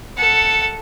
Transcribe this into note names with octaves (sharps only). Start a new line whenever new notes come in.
A4 F#5